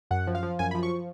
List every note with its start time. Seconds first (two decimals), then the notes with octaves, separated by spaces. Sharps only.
0.11 F#2 F#5
0.27 F3
0.35 F5
0.43 F3
0.59 F#2 G#5
0.71 B5
0.75 F3
0.83 C#6